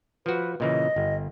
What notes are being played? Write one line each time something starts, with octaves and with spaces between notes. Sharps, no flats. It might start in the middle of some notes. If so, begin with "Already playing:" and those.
F3 F#4 B4
A#2 C#3 E3 D#5
G1